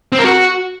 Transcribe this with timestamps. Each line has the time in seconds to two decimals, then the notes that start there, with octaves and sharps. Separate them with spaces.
0.12 C4
0.19 A#4
0.25 F#4